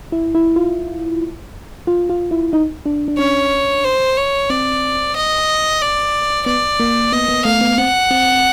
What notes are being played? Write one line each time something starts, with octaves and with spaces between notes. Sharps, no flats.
E4
E4
F4
F4
F4
E4
D#4
D4
D4
C#4 C#5
C5
C#5
C4 D5
D#5
D5
B3 D5
A#3
B3 D#5
B3
A3 F5
B3
C4 F#5
C4